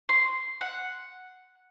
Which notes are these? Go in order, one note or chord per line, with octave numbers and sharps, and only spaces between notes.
C6
F#5